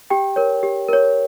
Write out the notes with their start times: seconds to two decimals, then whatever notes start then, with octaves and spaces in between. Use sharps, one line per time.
0.10 G4 G5
0.36 A#4 C#5
0.63 G4
0.88 A#4 C#5